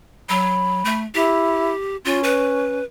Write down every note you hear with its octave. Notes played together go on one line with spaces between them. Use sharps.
F#3 B5
A3
E4 G4
C#4 F4
B4